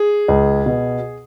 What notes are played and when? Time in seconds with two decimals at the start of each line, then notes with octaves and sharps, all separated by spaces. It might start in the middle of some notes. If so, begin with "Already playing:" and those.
Already playing: G#4
0.28 C#2
0.66 B2